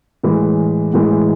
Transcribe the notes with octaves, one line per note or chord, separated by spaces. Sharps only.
A2 E3 G#3
A2 E3 G#3